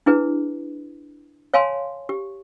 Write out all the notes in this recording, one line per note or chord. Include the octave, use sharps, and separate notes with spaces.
D4 E4 G#4 B4
C#5 F5 G#5 A5 C6
G4